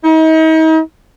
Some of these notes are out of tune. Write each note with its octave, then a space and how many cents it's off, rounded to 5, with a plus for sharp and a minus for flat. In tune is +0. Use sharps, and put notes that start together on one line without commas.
D#4 +40